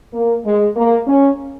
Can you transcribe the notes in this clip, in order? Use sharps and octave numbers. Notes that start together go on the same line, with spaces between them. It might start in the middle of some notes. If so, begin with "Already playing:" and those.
A#3
G#3
A#3
C#4